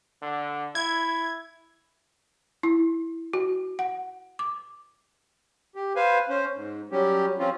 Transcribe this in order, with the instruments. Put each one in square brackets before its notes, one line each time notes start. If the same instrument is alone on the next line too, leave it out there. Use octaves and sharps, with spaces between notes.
[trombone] D3
[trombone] E4 [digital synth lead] G#6
[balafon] E4
F#4
F#5
D6
[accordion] G4
B4 C5 F5 G#5
C#4 C5
G#2
F#3 G3 C#4 G4
F3 C4 C#4 F4